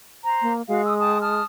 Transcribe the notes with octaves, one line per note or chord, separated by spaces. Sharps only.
C5 A#5
A#3
G#3 F#4 F5
D#6 E6
G5 A5 D#6
A5 D#6 F6